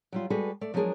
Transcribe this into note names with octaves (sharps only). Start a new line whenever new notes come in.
F#3 G3 F4
G3 G#3 F#4 G#4 A4 B4
A3 D5
F3 F#3 G#3 D4 G#4 A#4